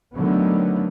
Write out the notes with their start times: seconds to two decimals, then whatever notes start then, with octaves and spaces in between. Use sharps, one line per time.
0.14 D3 D#3 F#3 A3 B3